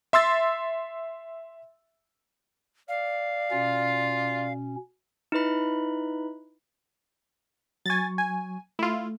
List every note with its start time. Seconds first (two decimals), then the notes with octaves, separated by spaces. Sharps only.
0.13 E5 C6 E6 A6
2.89 D5 F5
3.51 B2 C#4 F4
5.32 D#4 E4 B4 B5
7.86 F#3 G#5 C#6 A6
8.18 G#5
8.79 A3 E4 F4